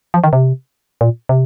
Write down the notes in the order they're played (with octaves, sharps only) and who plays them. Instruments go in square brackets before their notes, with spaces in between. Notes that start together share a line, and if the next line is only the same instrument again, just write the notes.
[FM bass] F3
D#3
C3
A#2
C3